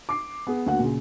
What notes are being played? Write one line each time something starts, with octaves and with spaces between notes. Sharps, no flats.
D6 C7
B3 G#4
D2 A#3 F#4 F#5
A#2 C#3